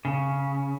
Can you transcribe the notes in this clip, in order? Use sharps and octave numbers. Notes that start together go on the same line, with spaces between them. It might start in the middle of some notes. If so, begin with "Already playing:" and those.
C#3